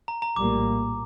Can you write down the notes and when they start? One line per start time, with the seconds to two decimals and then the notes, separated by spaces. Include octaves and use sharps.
0.08 A#5
0.22 A#5
0.36 A#1 A2 G3 A#3 D6